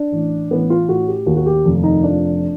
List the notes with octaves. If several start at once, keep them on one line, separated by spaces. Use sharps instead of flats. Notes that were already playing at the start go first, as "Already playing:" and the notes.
Already playing: D4
A1
A1 B3
F4
A2 F#4
G4
D#2 F#4
F#4
G4
F1
D#4
F3 D4